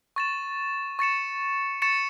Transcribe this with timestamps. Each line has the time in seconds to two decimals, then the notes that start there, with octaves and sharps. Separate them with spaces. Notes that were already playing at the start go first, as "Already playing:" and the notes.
0.16 C#6 A6 E7
0.99 C#6 A6 C#7 E7
1.82 C#6 A6 C#7 E7